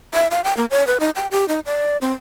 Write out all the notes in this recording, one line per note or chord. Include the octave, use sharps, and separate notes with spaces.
E5
F5
G5
A#3
C#5
B4
D#4
G5
G4
D#4
D5
C4